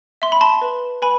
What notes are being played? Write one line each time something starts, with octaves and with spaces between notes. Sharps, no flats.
E5 C6
B5
A5 C6
B4
B4 G#5 B5